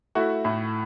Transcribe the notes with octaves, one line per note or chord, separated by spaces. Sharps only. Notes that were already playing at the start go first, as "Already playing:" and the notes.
A3 E4 F#4
A2